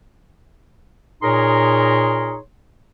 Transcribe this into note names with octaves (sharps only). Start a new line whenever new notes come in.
A#2 D#4 G#4 A#4 C#5 C6